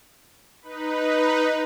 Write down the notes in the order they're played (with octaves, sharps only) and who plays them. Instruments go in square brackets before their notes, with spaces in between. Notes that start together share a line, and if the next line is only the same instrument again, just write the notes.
[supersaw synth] D#4 B4